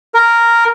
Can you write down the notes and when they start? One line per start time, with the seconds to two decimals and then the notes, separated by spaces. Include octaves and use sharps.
0.14 A#4